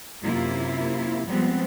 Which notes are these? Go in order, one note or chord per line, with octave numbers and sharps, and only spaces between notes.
F#2 C3 A#3 E4 F4
F3 G3 G#3 B3 C4